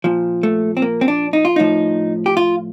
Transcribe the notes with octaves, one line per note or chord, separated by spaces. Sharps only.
A#2 F3
A3
C4
A#3
C4
D4
D#4
F4
A2 F3 D#4
G4
F4